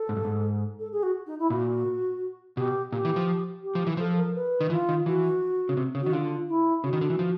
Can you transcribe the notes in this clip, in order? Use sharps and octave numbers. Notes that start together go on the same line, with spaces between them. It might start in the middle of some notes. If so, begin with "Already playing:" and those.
Already playing: A4
G#2
G2
G#2
A4
G#4
F#4
D#4
E4
A#2 F#4
B2 G4
A#2 G4
E3
F3
G4
F3
E3
F3 A4
A#4
B4
D#3
E3 F4
D#3
E3 F#4
C#3
C3
C#3
F#4
D#3
D3 F4
E4
C#3 F#4
D#3
D3
E3
F3